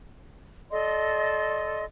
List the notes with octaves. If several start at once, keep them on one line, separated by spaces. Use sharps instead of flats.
A4 D5 D#5 C6